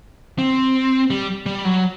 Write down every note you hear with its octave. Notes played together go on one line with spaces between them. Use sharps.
C4
G3
G3
F#3